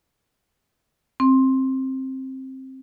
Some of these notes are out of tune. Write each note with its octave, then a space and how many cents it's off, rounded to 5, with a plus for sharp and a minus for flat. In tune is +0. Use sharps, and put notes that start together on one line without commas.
C4 +15